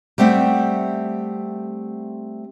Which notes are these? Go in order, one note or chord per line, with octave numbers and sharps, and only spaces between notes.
G3 A3 C4 E5 F#5